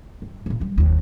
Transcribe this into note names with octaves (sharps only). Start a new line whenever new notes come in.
G2
F#2 A#2
F#3 G3
F#1 D#2